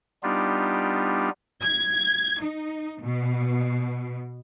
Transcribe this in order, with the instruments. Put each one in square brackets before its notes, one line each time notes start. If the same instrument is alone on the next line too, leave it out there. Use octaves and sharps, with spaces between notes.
[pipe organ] G3 B3 D4 D#4 F4 G4
[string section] G#6
D#4
B2